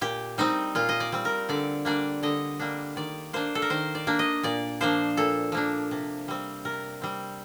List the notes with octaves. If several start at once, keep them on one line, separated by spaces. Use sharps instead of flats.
A#2 G4
G3 C4 D#4
A#2 F4
D#5
D5
G3 C4
A#4
D3 D5
G3 A#3 D4 D5
D3 D#5
G3 A#3 D4
D#3 D5
A#3 D4 C5
A4
A#4
D#3 C5
D5
A#3 D4
D#5
A#2 D5
F3 A#3 D4 C5
A#2 A4
F3 A#3 D4
C3
G3 C4
C3 A#4
G3 C4